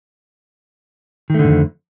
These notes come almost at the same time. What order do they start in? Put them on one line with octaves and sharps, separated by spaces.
D#3 A3 D3 G#2 F2